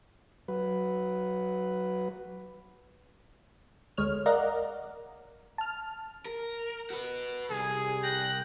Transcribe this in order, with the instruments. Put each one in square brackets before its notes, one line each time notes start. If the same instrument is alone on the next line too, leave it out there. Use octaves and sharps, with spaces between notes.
[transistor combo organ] F#3 B4
[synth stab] D2 G#3 C#5 F6
A#4 D5 D#5 F5 F#5 A#5
A5 F6
[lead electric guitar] A#4
F#4 B4
[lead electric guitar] C2 [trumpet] G#4
[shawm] G5 [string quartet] F#6 A#6